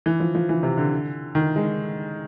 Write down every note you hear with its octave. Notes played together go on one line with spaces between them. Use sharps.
E3
F3
F3
E3
C3
D3
D#3
G#3